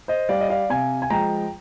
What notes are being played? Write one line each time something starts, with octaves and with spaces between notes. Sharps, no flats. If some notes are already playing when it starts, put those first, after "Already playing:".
C5 D#5
G3 D5 F5
D#5
D5 F5
C3 F5 G#5
G#5
F3 G#3 G5 A#5